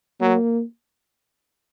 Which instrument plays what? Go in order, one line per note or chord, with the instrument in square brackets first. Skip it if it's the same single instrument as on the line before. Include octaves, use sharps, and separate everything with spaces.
[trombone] F#3 [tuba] A#3